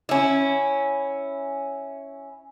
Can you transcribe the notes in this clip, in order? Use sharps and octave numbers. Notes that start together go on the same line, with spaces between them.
C#4 E4